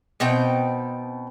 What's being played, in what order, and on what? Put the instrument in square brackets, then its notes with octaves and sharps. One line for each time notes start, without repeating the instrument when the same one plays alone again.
[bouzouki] B2 C4 D#4 G5